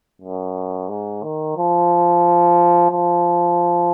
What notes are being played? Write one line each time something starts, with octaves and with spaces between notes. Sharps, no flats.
F#2
G#2
D#3
F3
F3